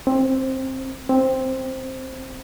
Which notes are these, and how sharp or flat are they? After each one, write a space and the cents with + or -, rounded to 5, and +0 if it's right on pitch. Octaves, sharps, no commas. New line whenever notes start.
C4 +15
C4 +5